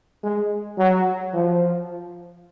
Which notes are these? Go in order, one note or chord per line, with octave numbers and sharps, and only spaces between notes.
G#3
F#3
F3